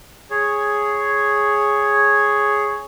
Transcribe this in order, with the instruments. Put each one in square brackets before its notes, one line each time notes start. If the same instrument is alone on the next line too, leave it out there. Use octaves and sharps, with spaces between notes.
[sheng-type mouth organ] G#4 C#5